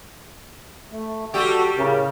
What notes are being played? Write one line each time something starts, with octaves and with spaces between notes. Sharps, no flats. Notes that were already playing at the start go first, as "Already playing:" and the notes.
A3
G3 F#4 G4 A4
A2 C#3 A#4